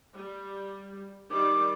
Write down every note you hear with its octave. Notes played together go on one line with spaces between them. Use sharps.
G3
D#3 G3 D5 D6